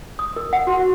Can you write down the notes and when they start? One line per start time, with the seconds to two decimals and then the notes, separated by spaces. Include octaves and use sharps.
0.19 D#6
0.36 A#4
0.53 F#5
0.67 F#4